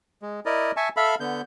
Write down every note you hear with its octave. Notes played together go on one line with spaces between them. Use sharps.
G#3
E4 A#4 D5 D#5
E5 G#5 A5 C#6
A4 E5 F5 B5
D3 B3 G6